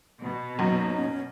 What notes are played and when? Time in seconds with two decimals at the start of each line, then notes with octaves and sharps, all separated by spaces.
0.22 B2
0.59 F#2 F#3 D#4 F#4
0.97 C#4